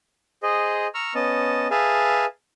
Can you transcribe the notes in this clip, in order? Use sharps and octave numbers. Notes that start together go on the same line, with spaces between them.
G#4 C5 D#5
A#5 C#6 E6 F6
B3 C#4 D#5 A5
G#4 B4 E5 F5 G#5 A5